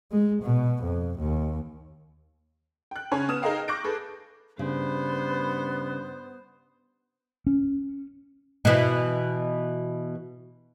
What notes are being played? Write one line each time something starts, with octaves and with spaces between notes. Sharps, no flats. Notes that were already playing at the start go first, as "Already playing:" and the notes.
G#3
B2
F2
D#2
G5 F#6
C#3 C#4 C#5 G#5
B3 D#6 F6 E7
D#4 G#4 A#4 D#5 F5 G5
C#6 D6 F#6 G6 A#6 D7
G#4 A4 B4
G2 C#3 B3 C5
C#4
B2 E3